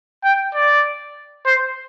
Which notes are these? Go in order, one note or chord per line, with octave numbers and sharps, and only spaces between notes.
G5
D5
C5